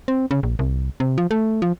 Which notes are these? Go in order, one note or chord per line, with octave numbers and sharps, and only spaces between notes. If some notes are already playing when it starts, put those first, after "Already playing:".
C4
C#3
A#1
C2
C3
F3
A3
F3